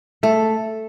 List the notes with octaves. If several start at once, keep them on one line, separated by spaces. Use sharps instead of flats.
A3 A4